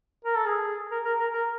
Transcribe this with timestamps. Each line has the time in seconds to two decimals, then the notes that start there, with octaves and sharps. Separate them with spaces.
0.25 A#4
0.37 A4
0.46 G#4
0.91 A#4
1.05 A#4
1.19 A#4
1.33 A#4